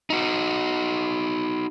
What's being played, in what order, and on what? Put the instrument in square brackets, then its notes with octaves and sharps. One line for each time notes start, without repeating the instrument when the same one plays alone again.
[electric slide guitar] D#4 F#4